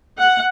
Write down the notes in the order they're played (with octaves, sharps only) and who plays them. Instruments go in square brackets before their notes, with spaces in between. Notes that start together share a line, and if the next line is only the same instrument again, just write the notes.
[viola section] F#5